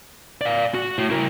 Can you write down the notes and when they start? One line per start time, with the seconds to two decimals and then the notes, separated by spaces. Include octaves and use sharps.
0.41 D5 F5
0.75 F#4
0.98 A2
1.10 E4 A#4